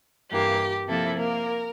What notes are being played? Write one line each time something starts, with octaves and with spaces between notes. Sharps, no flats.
G2 E3 A#3 G4
C3 F3 A#3 E4 A4
A#3 A#4